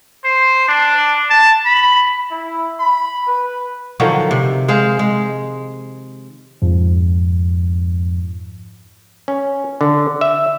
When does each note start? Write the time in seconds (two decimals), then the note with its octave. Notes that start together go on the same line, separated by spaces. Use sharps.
0.24 C5
0.68 D4
1.30 A5
1.65 B5
2.31 E4
2.79 B5
3.28 B4
4.00 D3 D#3 F3 F#3
4.31 C3
4.68 G#3 G#4 C5 F5
4.99 G#3
6.62 F2 G#2 F3
9.28 C#4
9.81 D3
10.21 E5